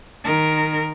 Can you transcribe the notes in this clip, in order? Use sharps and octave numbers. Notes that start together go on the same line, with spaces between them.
D#3 A#4